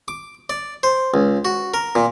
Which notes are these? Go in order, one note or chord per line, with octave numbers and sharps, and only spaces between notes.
D6
D5
C5
C#2
F#4
A#4
A#2